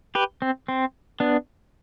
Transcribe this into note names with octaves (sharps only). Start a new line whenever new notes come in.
G4 B4
C4
C4
B3 D4